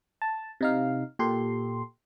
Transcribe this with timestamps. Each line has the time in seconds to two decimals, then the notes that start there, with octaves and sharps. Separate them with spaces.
0.22 A5
0.61 C3 D#4 F5
1.19 A#2 G4 A4 C6